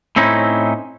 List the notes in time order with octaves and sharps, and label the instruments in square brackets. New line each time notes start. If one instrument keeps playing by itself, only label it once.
[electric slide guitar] A2 C4 C#4 D#4 E4